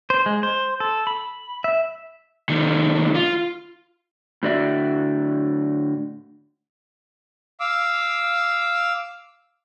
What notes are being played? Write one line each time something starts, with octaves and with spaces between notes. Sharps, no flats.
C5
G#3
C5
A4
B5
E5
C2 D#3
F4
A2 D3 F#4 D5 E5
F5 D6 E6